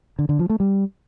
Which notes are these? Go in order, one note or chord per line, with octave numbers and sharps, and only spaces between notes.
D3
D3
F3
A3
G3